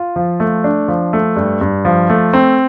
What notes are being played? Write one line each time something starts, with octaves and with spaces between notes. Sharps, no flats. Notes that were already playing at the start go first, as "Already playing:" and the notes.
Already playing: F4
F3
A3
D4
F3
A3
G2
G2
F3
A3
C4